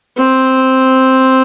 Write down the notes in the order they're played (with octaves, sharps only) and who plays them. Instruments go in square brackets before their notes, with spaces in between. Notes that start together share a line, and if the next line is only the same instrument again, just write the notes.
[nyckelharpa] C4